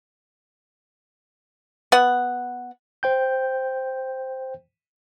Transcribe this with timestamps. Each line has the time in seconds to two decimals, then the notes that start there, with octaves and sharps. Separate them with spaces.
1.92 B3 F#5
3.03 C5 G5 G6